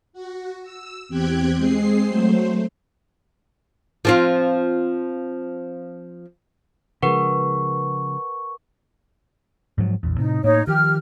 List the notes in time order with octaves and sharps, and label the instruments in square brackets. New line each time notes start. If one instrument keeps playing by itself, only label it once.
[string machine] F#4
E6
E2 C4 G4 G5 F#6 G#6
G#3 C4 G#4 C7
F#3 A3 C5
[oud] F3 C4 F4
[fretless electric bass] C#3 F3 G#3 [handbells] A#4 B4 F#5 [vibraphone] C#6
[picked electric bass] G#2 F3 F#3
A#1 E2
[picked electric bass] A2 C3 [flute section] D#4
[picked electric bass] A2 A#3 [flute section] D#4 C#5
[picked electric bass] D#3 F3 [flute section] G4 F6